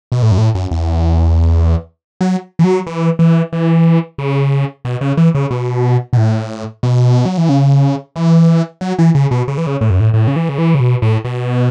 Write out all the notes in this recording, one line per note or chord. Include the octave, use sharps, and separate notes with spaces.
B2
A2
F#2
A2
F#2
E2
F#3
E3
F#3
E3
E3
E3
C#3
B2
C#3
E3
C#3
B2
B2
A2
B2
F#3
E3
C#3
E3
F#3
E3
C#3
B2
C#3
E3
C#3
A2
F#2
A2
A2
C#3
E3
C#3
E3
C#3
B2
A2
B2